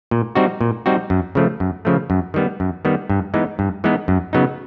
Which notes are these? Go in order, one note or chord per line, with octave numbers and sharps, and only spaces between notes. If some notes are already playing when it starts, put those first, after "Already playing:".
A#2
G3 C4 D#4 F#4
A#2
G3 C4 D#4 F#4
F#2
C#3 F3 A3
F#2
C#3 F3 A3
F#2
D#3 G3 B3
F#2
D#3 G3 B3
G2
E3 G#3 B3 D#4
G2
E3 G#3 B3 D#4
F#2
C#3 F#3 B3 D#4